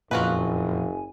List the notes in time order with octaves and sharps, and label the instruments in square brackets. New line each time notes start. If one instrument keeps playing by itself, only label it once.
[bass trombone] F#1 [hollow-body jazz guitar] F2 A#2 [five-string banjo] F4 F#4 B4 [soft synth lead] G#5